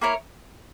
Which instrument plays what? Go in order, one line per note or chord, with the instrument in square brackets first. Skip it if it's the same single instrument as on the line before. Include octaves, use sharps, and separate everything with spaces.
[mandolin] A#3 E4 A#4 C#5